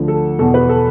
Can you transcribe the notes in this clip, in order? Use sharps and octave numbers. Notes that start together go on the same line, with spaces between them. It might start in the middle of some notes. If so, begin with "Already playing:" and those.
Already playing: D2 D3 F3
A4
E2 B2 A4
B4
A4